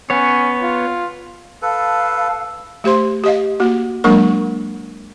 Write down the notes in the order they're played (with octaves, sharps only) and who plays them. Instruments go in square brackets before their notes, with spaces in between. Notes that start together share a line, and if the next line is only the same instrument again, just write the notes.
[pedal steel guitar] B3 C#5 [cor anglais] C#4
[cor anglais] F4
[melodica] A4 B4 [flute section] F5 A5
[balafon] A3 G4 C5 C6
G4 D#5 F5
A#3 F#4
F#3 G#3 A#3 D4 A#4 C#6